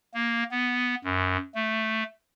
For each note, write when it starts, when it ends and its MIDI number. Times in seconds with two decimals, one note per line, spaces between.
0.14 0.44 58
0.51 0.95 59
1.04 1.37 42
1.55 2.03 57